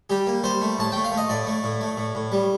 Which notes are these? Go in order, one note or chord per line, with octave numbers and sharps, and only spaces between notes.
G3 G4
A#3
G3 C5
A3
A2 A5
A3 G5
F5
A3
D#5
A2 D5
A3
A2
A3
A2
A2
G3